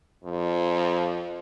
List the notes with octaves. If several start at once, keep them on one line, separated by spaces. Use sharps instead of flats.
F2